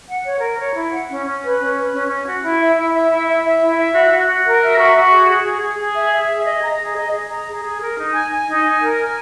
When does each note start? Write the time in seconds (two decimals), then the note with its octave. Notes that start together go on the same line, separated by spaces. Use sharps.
0.08 F#5
0.24 C#5
0.40 A#4
0.58 C#5
0.75 E4
0.91 F#5
1.08 C#4
1.26 C#4
1.42 B4
1.59 C#4
1.75 B4
1.92 C#4
2.08 C#4
2.26 F#4
2.43 E4
2.60 E5
2.76 E4
2.93 E5
3.10 E4
3.27 E5
3.43 E5
3.60 E4
3.77 E5
3.94 F#4
4.10 F#4
4.27 F#4
4.44 A#4
4.61 E5
4.78 F#4
4.94 F#4
5.11 G#4
5.29 G#4
5.45 G#4
5.62 G#4
5.79 G#4
5.95 E5
6.12 E5
6.29 G#4
6.46 D#5
6.62 A#5
6.79 G#4
6.96 D#5
7.12 G#4
7.29 A#5
7.46 G#4
7.63 G#4
7.80 A#4
7.97 D#4
8.13 G#5
8.30 G#5
8.47 D#4
8.64 G#5
8.81 A#4
8.98 G#5